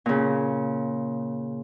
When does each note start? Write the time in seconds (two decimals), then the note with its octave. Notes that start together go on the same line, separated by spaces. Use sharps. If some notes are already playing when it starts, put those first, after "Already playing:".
0.06 A#2 C#3